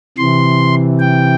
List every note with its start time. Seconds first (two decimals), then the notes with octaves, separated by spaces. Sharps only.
0.18 C3 E3 C6
1.00 G5